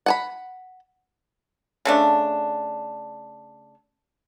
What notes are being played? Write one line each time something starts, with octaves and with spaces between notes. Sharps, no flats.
F#5 G#5 B5
C#3 A3 D4